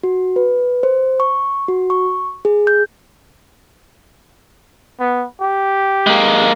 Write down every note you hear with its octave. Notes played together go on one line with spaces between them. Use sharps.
F#4
B4
C5
C#6
F#4
C#6
G#4
G6
B3
G4
G#3 A#3